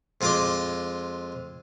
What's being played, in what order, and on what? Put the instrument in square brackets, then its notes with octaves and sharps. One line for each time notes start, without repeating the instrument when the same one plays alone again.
[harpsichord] F2 G#3 F4 C6 D6